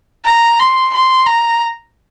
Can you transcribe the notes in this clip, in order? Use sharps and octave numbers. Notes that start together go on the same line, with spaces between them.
A#5
C6
C6
A#5